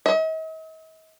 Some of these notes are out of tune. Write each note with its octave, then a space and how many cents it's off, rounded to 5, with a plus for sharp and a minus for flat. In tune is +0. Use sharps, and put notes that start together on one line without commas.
D#5 +45